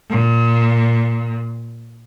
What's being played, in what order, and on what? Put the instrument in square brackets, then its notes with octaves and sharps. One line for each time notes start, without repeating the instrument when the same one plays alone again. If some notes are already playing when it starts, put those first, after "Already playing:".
[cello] A#2